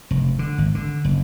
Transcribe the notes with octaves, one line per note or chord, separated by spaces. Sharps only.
F1
D3
G#1
D3
F#1